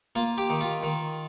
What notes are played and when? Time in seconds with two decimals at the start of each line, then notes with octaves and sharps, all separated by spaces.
0.16 A#3 F4
0.38 G4
0.50 D#3
0.61 F4
0.83 D#3